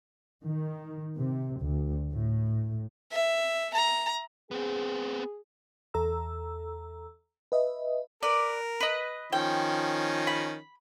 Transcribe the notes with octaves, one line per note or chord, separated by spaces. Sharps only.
D#3
C3
D2
A2
E5
A#5
B3 C4 G#4
E2 A4 A#5 E6
B4 D#5 E5
A#4 B4 D5
B4 D#5
D#3 F3 C#4 G5
B5